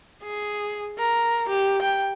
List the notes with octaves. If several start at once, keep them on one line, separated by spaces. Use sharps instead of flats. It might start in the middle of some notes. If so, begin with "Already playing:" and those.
G#4
A#4
G4
G5